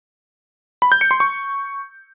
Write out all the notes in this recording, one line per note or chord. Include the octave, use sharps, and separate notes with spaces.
B5
G6
C#7
C6
C#6